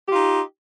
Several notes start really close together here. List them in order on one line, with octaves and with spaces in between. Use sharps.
G4 F4 D#4